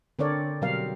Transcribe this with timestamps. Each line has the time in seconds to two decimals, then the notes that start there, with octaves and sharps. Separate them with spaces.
0.19 D3 C4 A4 A#4 C#5 D5
0.62 B2 F#3 G3 C4 A#4 F5